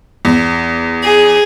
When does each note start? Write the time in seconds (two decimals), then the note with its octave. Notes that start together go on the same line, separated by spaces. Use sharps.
0.25 E2
1.04 G#4